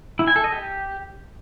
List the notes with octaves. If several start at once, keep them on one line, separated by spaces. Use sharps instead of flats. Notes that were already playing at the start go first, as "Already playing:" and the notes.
E4
G#5
A4
D#5
G4